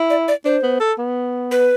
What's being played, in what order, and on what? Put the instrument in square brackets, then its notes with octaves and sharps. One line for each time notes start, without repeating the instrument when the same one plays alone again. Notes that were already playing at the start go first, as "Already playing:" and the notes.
Already playing: [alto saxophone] E4
[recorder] D5
D5
[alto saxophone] D4 [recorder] C5
[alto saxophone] B3
A4
B3
[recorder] B4